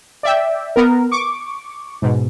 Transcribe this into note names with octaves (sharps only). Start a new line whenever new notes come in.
D5 E5 G5
B3 A#4
C#6 D6
G#2 B2